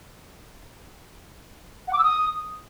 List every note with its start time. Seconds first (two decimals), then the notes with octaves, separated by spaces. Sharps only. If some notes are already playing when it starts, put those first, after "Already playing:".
1.88 F#5
1.93 D6
1.98 E6
2.04 D#6